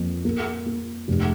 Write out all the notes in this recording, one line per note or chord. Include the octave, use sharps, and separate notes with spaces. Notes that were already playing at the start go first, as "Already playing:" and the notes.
Already playing: F2 A#3
A#3
A#3
F1